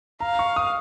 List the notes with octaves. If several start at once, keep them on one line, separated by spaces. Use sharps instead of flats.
F5 A#5
C#6
D#6